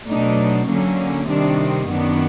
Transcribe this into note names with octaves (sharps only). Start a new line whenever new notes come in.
B2 F#3 A3 D4 D#4
D3 F#3 A#3 C#4
C3 D#3 G3 C4 D4
F#2 D#3 F#3 B3 D4